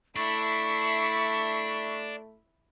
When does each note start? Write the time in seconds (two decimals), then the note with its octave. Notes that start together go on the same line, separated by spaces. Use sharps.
0.16 A3 D4 E4 E5 C#6